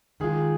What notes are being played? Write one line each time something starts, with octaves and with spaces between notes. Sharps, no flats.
D#3 G#3 F4 G#4